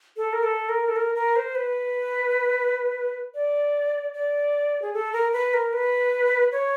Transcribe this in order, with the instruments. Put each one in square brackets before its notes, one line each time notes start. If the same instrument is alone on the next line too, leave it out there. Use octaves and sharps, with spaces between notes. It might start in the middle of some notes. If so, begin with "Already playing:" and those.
[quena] A4
A#4
A4
A#4
A4
A#4
A#4
C5
B4
D5
D5
G#4
A4
A#4
B4
A#4
B4
C#5